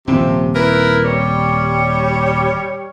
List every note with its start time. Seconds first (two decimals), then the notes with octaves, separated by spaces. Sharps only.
0.07 D#1 C3 F3 C4
0.54 E4 A#4 B4
1.05 G3 C#5